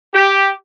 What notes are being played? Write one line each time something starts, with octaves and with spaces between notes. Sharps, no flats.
G4